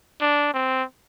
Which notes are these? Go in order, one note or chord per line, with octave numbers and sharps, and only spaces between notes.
D4
C4